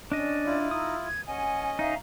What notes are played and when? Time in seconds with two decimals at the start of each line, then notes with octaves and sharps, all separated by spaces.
0.12 C#4 D4 D5 D#5
0.46 E4 F4
0.71 D#4 D#6 E6
1.07 G#6
1.28 C#4 D#5 F#5 G#5
1.79 D#4 E5 F5 A#5